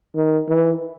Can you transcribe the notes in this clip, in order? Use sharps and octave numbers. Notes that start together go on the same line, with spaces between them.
D#3
E3